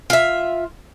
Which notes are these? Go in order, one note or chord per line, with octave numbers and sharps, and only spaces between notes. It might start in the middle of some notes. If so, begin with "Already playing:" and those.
F4 E5